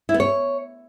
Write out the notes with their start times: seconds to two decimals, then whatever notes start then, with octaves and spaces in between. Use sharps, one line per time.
0.09 E4
0.14 B3
0.20 C#5